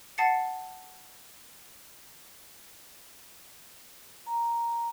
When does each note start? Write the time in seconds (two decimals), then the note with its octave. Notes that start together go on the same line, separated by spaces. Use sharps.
0.18 F#5 A5 A6 C7 C#7
4.26 A#5